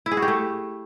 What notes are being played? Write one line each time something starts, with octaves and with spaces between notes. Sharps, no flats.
E4
G#4
F#4
G4
A3